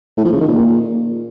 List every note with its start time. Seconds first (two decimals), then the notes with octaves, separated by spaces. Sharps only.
0.17 A2
0.25 F3
0.33 C#3
0.41 D#3
0.48 A#2